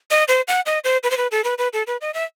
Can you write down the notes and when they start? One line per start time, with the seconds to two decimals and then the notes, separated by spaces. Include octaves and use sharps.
0.11 D#5
0.28 C5
0.48 F#5
0.66 D#5
0.84 C5
1.03 B4
1.11 C5
1.17 B4
1.31 A4
1.44 B4
1.58 B4
1.73 A4
1.87 B4
2.01 D#5
2.14 E5